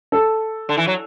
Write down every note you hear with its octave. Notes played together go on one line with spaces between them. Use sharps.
A4
D3
E3
F#3